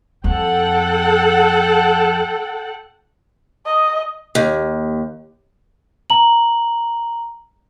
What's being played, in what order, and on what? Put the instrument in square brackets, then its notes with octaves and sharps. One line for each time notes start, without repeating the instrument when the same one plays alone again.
[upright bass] F2 [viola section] A4 F#5 G5
[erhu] D#5
[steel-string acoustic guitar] D#2
[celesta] A#5 F#7